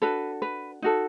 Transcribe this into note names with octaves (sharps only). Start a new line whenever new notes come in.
D4 F#4 A4 B4
B4
D#4 F#4 A4